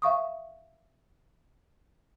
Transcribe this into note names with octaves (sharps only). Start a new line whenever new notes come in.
E5 F5 C#6 D#6